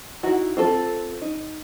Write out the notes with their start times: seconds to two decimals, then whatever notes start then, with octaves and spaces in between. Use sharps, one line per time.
0.23 D#4 E4 F#4
0.57 C4 F4 A4
1.21 D#4